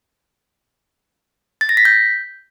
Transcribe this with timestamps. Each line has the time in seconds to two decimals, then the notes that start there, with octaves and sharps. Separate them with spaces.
1.61 A6
1.69 A#6
1.77 B6
1.85 G6